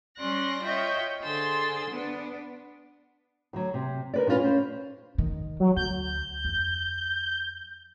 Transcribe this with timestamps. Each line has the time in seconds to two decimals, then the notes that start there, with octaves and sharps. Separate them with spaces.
0.18 G3 C#4 D5 C6 F#6 A#6
0.62 F4 C#5 D#5 E5 G5
1.22 D3 G#4 C5 C6 E6 A6
1.90 B3 D4
3.53 D2 F#3
3.74 C3
4.14 A#4 B4 D5
4.27 A#2 C#4 E4 F4 B4
4.40 C#4 C5
5.18 D#3
5.60 F#3
5.77 D2 G6
6.45 F2